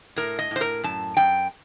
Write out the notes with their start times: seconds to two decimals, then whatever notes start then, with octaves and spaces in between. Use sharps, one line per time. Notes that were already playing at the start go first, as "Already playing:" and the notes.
0.16 A2 A#4
0.39 D#5
0.51 A2 C5
0.61 A#4
0.84 F#2 A5
1.17 F#2 G5